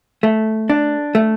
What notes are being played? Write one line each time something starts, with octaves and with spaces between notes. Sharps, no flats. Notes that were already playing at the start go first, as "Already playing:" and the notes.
A3
D4
A3